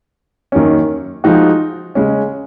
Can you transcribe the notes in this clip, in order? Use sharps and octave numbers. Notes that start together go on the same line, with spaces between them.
F#2 D#3 A#3 C#4
F3 G#3 D#4 F#4
C#3 G#3 C#4